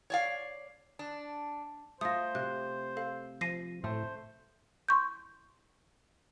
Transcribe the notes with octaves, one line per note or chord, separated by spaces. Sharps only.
C#5 D5 F5
D4
A3 F4 C5 D#6 A#6
C3 F#6
A4 F5
F3 A#6 C7 D#7
A2 A3 C5
C6 C#6 G6